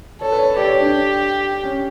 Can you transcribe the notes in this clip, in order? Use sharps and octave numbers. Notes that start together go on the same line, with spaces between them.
A4 C#5
B4
C#5
G4 D5
C#5
D4
C#4